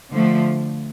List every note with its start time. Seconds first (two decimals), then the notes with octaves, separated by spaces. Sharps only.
0.12 D3 F3 A3